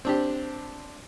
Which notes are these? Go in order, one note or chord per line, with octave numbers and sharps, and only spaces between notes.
C4 D4 G4